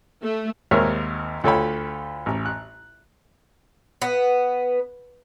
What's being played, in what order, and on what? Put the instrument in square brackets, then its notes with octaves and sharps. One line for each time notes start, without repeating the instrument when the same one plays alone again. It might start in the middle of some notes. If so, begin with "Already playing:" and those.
[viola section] A3
[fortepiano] G#1 D#2 G#2 A#4 C#5 E5
D2 F4 A4 C#5 G5 B5
A1
F#6
[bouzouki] B3